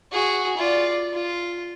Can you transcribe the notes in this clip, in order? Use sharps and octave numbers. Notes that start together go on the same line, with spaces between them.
F#4 G#4
F4 D5
F4